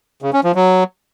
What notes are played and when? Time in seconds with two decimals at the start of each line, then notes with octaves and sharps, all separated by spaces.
0.22 C#3
0.33 C#4
0.44 F3
0.55 F#3